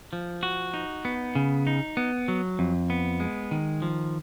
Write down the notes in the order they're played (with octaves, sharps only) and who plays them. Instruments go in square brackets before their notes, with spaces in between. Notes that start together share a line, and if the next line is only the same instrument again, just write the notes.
[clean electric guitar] F3
F#4
D#4
B3
C#3
D#4
B3
F#3
F2
B3
G#3
D#3
F3